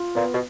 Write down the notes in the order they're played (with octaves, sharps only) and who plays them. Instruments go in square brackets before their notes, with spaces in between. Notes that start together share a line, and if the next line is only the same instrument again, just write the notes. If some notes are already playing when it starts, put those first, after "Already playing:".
Already playing: [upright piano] F4
[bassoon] A#2 [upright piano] B3
[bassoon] B2